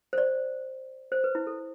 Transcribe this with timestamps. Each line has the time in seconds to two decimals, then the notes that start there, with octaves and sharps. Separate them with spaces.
0.13 C5
0.18 D5
1.12 C5
1.24 B4
1.35 E4
1.47 A4